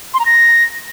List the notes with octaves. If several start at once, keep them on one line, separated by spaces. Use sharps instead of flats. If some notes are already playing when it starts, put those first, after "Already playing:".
C6
A#5
A#6